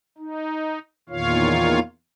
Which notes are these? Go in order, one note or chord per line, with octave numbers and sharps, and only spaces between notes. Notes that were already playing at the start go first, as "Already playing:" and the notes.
D#4
E2 A#2 D#3 F4 C#5 F5